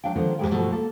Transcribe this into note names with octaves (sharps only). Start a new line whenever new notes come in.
F#3 D4 F5 G5
D3 D#3 F3 B3 D4 A#4
D#2 G#2 C3 G3 G#3 G5
G2 B2 F3 F#3 A3
A#3 A4